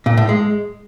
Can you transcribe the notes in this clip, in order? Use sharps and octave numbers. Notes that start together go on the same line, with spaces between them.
A#2
A2
G#3